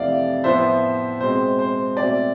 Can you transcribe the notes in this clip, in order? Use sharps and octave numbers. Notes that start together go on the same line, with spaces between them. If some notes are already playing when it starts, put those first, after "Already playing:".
Already playing: F2 C3 E3 A3 D5 F5
A2 F3 B3 C5 E5
B2 G#3 C4 C5
C5
B2 A3 C4 D5